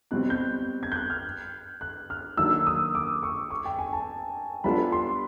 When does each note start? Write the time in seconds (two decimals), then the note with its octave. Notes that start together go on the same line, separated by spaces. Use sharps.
0.11 B2 G3 C4 F#6
0.30 G6
0.83 G#6
0.92 G6
0.96 F#6
1.10 F6
1.81 F#6
2.10 F6
2.37 D#3 F#3 A#3 D4 E6
2.67 D#6
2.95 D6
3.23 C#6
3.50 C#6
3.65 G5
3.79 G#5
3.93 A5
4.64 G3 B3 D4 F4 A4 B5
4.92 C6